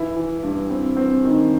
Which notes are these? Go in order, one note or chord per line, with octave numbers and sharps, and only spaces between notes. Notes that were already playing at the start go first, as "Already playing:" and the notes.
Already playing: E3 E4
E3
G2
C4
C4
D#3